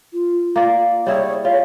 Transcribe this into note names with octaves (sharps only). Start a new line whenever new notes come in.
F4
A#3 D5
G3 E4 G#4 C#5
F4 C#5